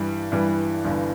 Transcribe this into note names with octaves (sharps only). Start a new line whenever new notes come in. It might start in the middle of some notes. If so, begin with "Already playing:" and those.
Already playing: G2 E3 G3
G2 E3 G3
G1 G2 E3